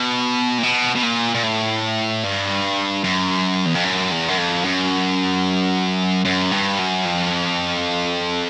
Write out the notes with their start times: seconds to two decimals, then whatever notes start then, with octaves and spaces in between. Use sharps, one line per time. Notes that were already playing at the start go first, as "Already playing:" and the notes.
Already playing: B2
0.58 A#2
0.63 B2
0.96 B2
1.03 A#2
1.35 A#2
1.44 A2
2.24 G2
3.04 F#2
3.66 E2
3.75 F2
3.84 F#2
4.11 E2
4.28 F#2
4.37 F2
4.64 F#2
6.25 F#2
6.51 G2
6.78 F#2
7.05 F2